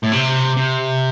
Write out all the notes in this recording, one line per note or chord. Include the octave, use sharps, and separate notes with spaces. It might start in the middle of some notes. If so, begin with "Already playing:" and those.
A2
C3
C3